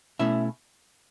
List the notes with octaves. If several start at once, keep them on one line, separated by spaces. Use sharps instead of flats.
B2 A3 C#4 E4 E5